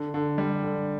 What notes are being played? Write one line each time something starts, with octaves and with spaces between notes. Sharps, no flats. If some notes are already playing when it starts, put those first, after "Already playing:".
Already playing: D3
D3
G3
D3